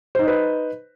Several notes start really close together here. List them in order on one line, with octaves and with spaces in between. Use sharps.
C5 D#4 D#5 B4